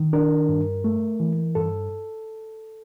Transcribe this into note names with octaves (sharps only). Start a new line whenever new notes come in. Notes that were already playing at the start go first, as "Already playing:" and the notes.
Already playing: D#3
D4 A#4
G2
A3
E3
G2 A4